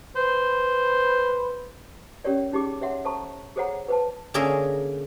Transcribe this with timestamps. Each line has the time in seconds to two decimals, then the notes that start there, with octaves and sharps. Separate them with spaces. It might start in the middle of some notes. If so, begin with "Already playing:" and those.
0.16 B4 C5
2.24 C#4 G4 A#4 C#5 D5
2.52 C#4 D#4 G4 G#4 D6
2.82 C#5 E5 F#5 C6
3.05 A4 C5 A5 A#5 C#6
3.56 G#4 A4 C5 C#5 F#5 A#5
3.88 B4 C5 A5
4.34 D3 A#3 C#4 G#4 A#4 E5